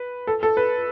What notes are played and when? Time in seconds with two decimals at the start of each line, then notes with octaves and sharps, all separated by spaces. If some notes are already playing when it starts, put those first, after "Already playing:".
Already playing: B4
0.27 A4
0.43 A4
0.57 B4